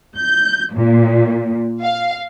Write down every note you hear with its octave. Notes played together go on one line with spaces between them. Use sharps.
G6
A#2
F5